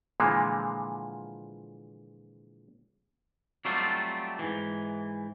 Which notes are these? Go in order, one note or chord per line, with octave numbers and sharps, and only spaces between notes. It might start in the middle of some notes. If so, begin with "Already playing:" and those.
A#2 D3 E3 F3 G#3 A#3
F#3 G3 A3 C4 F4
G#2 E3